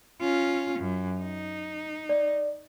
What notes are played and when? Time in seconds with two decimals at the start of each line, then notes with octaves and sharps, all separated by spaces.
0.21 C#4 F4
0.79 F#2
1.20 D#4
2.09 D5